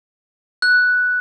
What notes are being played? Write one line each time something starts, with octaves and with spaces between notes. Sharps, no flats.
F#6